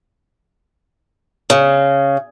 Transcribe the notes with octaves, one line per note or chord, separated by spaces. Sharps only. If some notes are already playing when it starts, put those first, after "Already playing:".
C#3